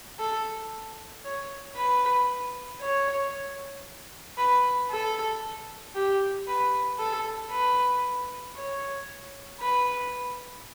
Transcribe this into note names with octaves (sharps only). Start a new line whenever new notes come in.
A4
C#5
B4
C#5
B4
A4
G4
B4
A4
B4
C#5
B4